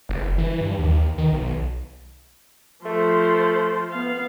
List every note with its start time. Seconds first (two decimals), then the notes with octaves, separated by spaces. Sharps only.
0.09 F#1
0.38 E3
0.61 G2
0.79 D#2
1.18 D#3
1.33 B1
2.85 F3 A3 C5
3.90 B3 F5